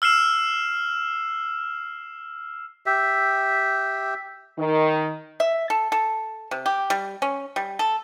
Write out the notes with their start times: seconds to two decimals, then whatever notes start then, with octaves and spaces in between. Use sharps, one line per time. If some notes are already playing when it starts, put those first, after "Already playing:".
0.02 E6 F6 C7 E7
2.86 G4 E5
4.59 D#3
5.40 E5
5.70 A4
5.92 A4
6.51 C3
6.66 G4
6.90 G3
7.22 C#4
7.56 G3
7.79 A4